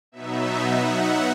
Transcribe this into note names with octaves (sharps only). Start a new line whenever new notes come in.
B2 F#3 B3 D#4 E5
F#5